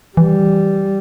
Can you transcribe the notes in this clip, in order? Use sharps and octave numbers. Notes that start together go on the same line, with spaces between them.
E3 G3